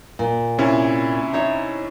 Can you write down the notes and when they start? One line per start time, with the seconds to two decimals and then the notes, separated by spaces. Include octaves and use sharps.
0.19 A#2
0.58 C3 C#4 E4
1.33 D#4 C#5 E5